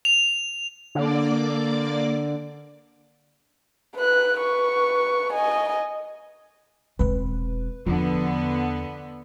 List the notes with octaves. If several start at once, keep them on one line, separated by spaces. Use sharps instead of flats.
F7
D3 A#3 D5 D6
B4 F#6
B4 C#6
D#5 G#5
E1 C4 B4
E2 D3 F3 B3